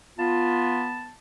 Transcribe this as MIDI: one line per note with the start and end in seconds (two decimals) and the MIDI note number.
0.19 1.13 59
0.19 0.85 65
0.19 1.15 81